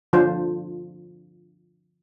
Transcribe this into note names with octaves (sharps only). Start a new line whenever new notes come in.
D3 F3 D4 F4 C5